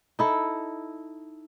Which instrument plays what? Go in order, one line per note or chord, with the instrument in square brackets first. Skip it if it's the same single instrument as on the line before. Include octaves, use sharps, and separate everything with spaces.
[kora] D#4 E4 A4